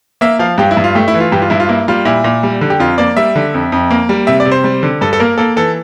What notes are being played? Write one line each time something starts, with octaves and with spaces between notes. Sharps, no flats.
A#3 E5
F3 F5
G2 G4
E4
G2
F4
A3 G4
E4
E3
F4
G2 G4
F4
G2 E4
F4
A#3 E4
G3 F4
A#2 E4
A#2
G3
D3
G4
F2 F4
A#3 D5
G3 E5
D3
F2
F2
A#3
G3
C3 E5
D5
C3
C5
G3
D3
G2 A4
A4
A#3 A#4
A#3 A4
E3 A4